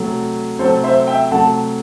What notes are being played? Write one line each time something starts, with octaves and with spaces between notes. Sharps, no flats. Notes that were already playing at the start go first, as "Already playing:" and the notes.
Already playing: C3 F#3 A3
C3 F#3 A3 A4 C5
C5 E5
E5 G5
C3 F#3 A3 F#5 A5